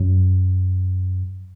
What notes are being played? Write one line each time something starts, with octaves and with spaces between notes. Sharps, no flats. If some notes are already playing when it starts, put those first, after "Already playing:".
Already playing: F#2